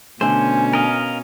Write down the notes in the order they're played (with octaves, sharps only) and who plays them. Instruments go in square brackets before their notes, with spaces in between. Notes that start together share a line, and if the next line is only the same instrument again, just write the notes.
[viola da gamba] B2 C#4 [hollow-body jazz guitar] D3 A3 [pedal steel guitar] C5 [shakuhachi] G#5
[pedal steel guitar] A#4 D#5 F5